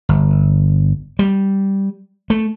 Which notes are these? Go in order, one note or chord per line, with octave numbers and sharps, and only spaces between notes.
G1
G3
A3